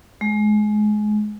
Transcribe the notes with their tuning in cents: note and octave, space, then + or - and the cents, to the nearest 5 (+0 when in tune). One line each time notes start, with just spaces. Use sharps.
G#3 +25